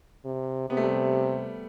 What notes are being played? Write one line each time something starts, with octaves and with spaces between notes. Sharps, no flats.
C3
C3 B3
A3
G3